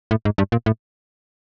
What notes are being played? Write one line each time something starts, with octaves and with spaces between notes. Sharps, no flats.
A2
G#2
G2
A#2
A2